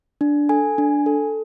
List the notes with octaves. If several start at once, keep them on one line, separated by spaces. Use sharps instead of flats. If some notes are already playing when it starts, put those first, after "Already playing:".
D4
A4 G#5
D4
A4